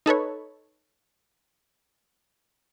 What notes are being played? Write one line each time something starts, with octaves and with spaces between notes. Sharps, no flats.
D#4 A4 B4 C#5